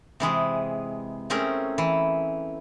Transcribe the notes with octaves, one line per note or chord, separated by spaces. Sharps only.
C3 E3 G#3 G#4
A3 C4 C#4 G#4 A#4
E3